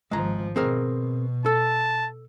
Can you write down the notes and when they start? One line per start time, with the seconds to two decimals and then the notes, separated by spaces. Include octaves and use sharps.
0.11 G#1 F3 G#3 A#5
0.56 B2 C4 G#4 A#4
1.46 A4 A5